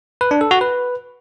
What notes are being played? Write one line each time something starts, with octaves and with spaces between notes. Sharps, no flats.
B4
D4
A4
F#4
B4